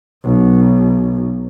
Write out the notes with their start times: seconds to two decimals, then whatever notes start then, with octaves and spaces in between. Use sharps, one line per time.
0.24 B1